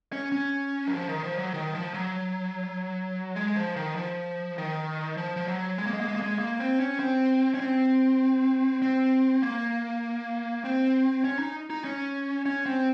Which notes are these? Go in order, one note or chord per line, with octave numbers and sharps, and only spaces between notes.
C#4
C#4
F#3
F3
D#3
F3
F#3
D#3
F3
F#3
G#3
F3
D#3
F3
D#3
F3
F3
F#3
G#3
A#3
G#3
A#3
G#3
A#3
G#3
A#3
C4
C#4
C4
C#4
C4
C4
A#3
C4
C#4
D#4
D#4
C#4
C#4
C4